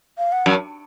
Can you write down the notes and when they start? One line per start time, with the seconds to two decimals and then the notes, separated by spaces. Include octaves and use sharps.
0.18 F5
0.32 F#5
0.46 F#2